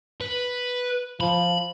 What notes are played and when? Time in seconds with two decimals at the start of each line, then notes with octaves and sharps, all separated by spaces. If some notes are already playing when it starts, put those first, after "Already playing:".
0.21 B4
1.21 F3 B5